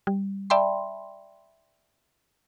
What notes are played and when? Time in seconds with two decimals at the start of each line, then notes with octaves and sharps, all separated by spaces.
0.07 G3
0.50 D5 E5 G5 A5 B5 C6